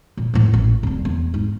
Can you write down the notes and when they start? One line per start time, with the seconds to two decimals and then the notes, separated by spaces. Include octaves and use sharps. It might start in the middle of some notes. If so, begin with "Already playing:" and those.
0.17 A#2
0.34 D1 A2
0.53 A1
0.83 D1 G3
1.05 E2
1.34 G#2 D#4